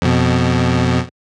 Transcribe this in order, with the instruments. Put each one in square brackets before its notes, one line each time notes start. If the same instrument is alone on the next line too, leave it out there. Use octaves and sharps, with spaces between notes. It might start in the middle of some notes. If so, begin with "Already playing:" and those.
[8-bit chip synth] F2 B2